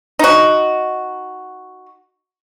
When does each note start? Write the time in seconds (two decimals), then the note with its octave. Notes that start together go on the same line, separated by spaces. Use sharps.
0.19 D#4 F#4